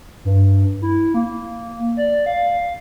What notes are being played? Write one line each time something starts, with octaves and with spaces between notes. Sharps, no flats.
G2
E4
A#3
D5
F5